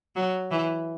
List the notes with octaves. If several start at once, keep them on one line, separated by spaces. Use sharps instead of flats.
F#3
E3